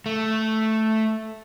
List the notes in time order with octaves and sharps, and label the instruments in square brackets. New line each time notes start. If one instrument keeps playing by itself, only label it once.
[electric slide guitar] A3